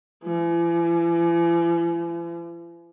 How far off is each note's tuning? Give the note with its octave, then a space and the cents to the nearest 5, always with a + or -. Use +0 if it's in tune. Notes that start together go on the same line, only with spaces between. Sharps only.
E3 +45